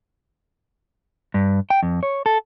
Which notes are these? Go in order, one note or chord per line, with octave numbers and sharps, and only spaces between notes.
G2
G5
F2
C#5
A4